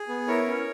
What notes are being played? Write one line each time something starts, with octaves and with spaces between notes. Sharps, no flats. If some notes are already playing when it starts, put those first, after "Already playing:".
Already playing: G#4
B3
E4 A#4 C#5
C#4